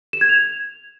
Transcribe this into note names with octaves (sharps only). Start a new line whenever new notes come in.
E7
G#6
F7